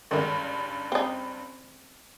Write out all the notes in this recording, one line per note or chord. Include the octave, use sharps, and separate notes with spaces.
F#1 G2 D3 D#3 G#3
C4 D#4